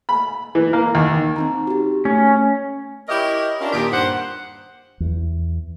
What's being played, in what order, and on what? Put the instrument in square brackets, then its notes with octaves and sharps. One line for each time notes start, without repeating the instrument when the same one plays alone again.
[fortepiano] B5
E3
A#3
D#2
[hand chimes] C4 D#4 A#5
F#4 G4
[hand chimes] A3 [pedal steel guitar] C#4
[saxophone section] E4 G4 A#4 C#5 D#5 E5
C#4 D4 F4 A#4
D#2 A#2 D#3 G4
G2 C5 F#5
[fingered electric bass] E2